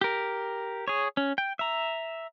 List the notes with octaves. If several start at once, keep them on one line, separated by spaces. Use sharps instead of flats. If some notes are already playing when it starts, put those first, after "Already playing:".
G4 A#4
G#4 C#5
C#4
G5
E5 A#5